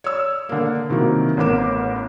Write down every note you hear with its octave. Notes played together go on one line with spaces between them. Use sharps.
C#5 D5 E6
D3 A#3
C3 D#3 E3 F#3 A#3
A1 A2 B3 A#4 D6 E7